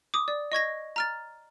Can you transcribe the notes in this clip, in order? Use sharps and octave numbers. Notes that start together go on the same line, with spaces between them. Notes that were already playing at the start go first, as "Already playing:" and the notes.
D6 D#6
D5
D#5 C#6 G#6 A#6
A#5 F6 A6